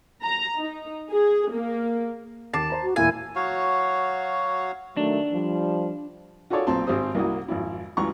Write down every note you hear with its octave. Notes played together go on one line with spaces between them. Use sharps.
A#5
D#4
G#4
A#3
D#2 A5 D6 C7
C5 A#5
F#4
E1 A#2 E4 F5 G#5
F#3 F#4 C#5 F5
D#3 F#3 A3 D4
F3 G3
F4 F#4 G#4 A4 C#5 D5
B1 A#2 C4 A5 C6
G#1 C4 G4 C5 D#6
C2 A#3 E4 F#4 D#6
G#1 F2 E4
C#2 G2 E3 F#3 A#5 C#6